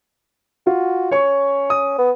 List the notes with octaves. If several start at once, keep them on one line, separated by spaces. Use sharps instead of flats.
F4 F#4
C#4 C#5 C#6
D#6
B3